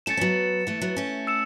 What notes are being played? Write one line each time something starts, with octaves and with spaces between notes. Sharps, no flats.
A3 C#4 A6 C#7 E7
C#4
F#3 B3
E3 A3
F#3 B3
A3 C#4
E6 C#7 E7